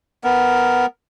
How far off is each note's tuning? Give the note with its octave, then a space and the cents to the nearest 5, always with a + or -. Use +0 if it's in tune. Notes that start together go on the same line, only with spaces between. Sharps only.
B3 +0 A#4 +0